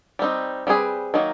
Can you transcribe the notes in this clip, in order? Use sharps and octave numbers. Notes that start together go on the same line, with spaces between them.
G3 C4 D#4
G3 C4 E4 G#4 B4
D#3 F#3 A#3 D#4